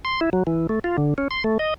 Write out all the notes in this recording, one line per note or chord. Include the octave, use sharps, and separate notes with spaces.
C6
E4
F#3
E3
A3
F4
D3
C#4
C6
A3
D#5